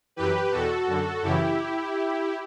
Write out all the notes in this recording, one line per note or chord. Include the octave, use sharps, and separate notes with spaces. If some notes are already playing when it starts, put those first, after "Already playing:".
F#2 E3 G4 B4
E2 B2 F#4 A4
F#2 D3
F#2 C#3 E3 E4 G4